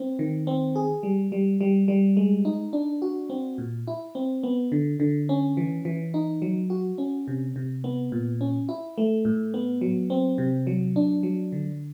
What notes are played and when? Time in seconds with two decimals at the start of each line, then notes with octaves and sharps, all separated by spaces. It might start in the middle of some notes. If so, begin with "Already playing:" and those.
Already playing: C4
0.19 D#3
0.47 C4
0.76 G#4
1.03 G3
1.32 G3
1.61 G3
1.88 G3
2.17 G#3
2.45 D#4
2.73 D4
3.02 F#4
3.30 C4
3.58 A#2
3.87 E4
4.15 C4
4.43 B3
4.72 D3
5.00 D3
5.29 C#4
5.57 E3
5.85 E3
6.14 D#4
6.42 F#3
6.70 F#4
6.98 C#4
7.28 C3
7.56 C3
7.84 B3
8.12 A#2
8.41 C#4
8.69 E4
8.98 A3
9.25 A2
9.54 B3
9.81 F#3
10.10 C4
10.38 C3
10.67 F#3
10.96 D4
11.23 F#3
11.52 D3